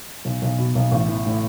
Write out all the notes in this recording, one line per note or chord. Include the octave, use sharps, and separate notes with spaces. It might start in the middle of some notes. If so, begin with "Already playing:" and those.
B1
B1
B2
B1
A1
E3
A2